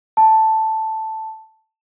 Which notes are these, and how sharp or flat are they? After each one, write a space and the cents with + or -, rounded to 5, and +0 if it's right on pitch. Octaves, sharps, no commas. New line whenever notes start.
A5 +0